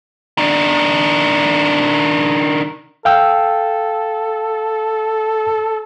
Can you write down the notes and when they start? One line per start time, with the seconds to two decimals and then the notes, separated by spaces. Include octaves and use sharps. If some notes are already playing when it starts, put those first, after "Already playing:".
0.38 D#3 D4
3.05 A4 F5 G5 E6